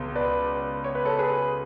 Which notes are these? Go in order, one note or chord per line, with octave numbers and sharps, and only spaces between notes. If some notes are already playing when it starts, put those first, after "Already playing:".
Already playing: C#2 B2
B4 D5
C#5
B4
A4 C#5
G#4 B4